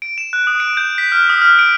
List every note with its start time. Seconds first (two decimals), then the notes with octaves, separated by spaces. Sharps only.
0.02 D7
0.18 E7
0.33 F#6
0.47 D#6
0.60 D7
0.77 G6
0.98 B6
1.12 F6
1.30 D#6
1.42 F6
1.59 D7